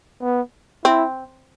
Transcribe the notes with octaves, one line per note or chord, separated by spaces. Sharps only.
B3
C4 E4